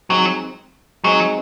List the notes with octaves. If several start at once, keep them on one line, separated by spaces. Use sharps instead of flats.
F#3 G#3 C4 D#4
F#3 G#3 C4 D#4